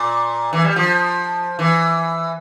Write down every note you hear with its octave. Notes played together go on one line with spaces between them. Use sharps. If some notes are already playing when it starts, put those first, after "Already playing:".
Already playing: A#2
E3
G3
F3
E3